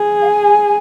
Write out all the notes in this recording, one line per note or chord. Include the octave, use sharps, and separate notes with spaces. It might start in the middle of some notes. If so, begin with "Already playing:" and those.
Already playing: G#4
F5
G#5